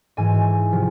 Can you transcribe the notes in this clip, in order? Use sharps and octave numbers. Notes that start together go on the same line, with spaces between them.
G#2 E3 G#5
C3 F3